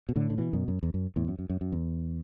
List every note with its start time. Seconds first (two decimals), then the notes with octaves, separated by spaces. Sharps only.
0.09 B2
0.16 A2 D3
0.30 D3
0.38 B2 E3
0.53 F#2 B2
0.68 F#2
0.83 E2
0.94 F#2
1.16 E2 A2
1.28 F#2
1.39 F#2
1.50 F#2
1.61 F#2
1.72 E2